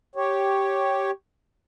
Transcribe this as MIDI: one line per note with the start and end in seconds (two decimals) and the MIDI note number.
0.15 1.11 67
0.15 1.11 73